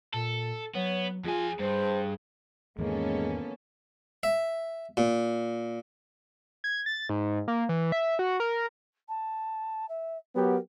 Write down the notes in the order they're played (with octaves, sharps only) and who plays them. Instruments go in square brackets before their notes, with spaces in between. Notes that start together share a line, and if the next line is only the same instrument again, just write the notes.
[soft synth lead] A#2 [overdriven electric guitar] A4
[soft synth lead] F#3 [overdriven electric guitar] B3 [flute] C#5
[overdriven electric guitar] F2 G#5 [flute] F4 [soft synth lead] G#4
[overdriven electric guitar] G2 [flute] C5
[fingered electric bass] E2 G#2 D#3 [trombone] G#3 [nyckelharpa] A#3 [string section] B3 C#4 A4
[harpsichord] E5
A#2
[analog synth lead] G#6
A6
G#2
A#3
E3
E5
F#4
A#4
[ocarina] A5
E5
[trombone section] F#3 B3 G4 [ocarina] A#4